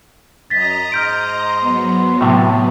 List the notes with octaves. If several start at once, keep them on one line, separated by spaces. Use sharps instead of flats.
F#2 D#5 A#5 A6 B6
G#2 C6 F6 G6 D7
F#3 B3
A2 C3 A5